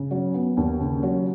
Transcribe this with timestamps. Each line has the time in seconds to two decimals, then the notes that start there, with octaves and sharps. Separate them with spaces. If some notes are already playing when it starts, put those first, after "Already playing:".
Already playing: C#3
0.11 F#3
0.34 B3
0.57 D#2
0.81 C#3
1.03 F#3